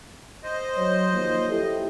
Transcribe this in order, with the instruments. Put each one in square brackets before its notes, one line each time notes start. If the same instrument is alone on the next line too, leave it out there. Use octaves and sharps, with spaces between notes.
[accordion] C5 D#5
[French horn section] F#3 C#5
D#2 F3
[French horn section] E4 G4 A4 [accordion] D#5